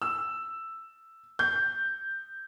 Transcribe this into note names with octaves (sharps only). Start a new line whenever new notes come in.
E6
G6